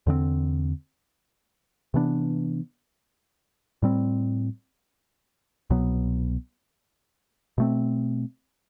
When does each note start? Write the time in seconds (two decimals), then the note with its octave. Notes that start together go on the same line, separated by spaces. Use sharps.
0.07 E2 D3 A3 C4
1.94 C3 E3 B3 D4
3.82 A2 G3 C4
5.70 C2 B2 F#3 B3
7.58 B2 A3 C4